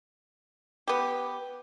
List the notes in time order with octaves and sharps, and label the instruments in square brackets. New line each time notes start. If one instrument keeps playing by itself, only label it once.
[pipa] B3 G4